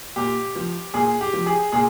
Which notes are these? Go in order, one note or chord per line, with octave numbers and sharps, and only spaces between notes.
A#2 G4
F3
A#2 G#4
G4
F3
G#4
A#2 G#4